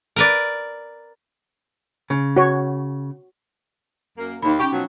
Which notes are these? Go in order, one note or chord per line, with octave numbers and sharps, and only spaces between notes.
A#4 B4 D5
C#3
F#4 C#5
F#2 A#3
D#2 D#4 B5
C#4 G4 G5 C#6
B2 F3 F#3